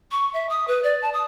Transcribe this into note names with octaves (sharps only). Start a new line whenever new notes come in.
C#6
E5
D#6
B4
D5
A5
D#6